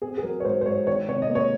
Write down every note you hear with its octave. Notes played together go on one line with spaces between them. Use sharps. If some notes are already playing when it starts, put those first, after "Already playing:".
C4 G#4
G#4
F#3 A#4
C#5
G#2 C5
C5
G#2 C#5
D#3 C#5
C3 C#5
D#5
A#3
C#5